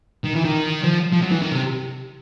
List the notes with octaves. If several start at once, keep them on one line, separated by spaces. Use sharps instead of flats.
D#3
E3
D#3
F3
F3
F#3
E3
D#3
C3